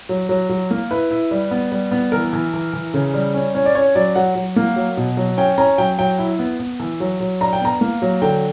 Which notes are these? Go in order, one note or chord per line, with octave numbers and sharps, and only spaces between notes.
F#3
F#3
F#3
A#3
E4 B4
E4
G3
B3
G3
B3
E3 A#4
E3
E3
E3
C#3
G3
C#4
C#4
D5
C#4 C#5
F#3 D5
F#3 F#5
F#3
A#3
F#3
B2
F#3
C#4 G5
C#4 A#5
F#3 G5
F#3 G5
E4
B3
B3
E3
F#3
F#3
D4 A#5
G5
B3 A#5
A#3
F#3
D3 G5